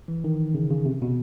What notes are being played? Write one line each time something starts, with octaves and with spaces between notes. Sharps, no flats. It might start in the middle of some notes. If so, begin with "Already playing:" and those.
E3
D#3
C#3
C#3
C3
B2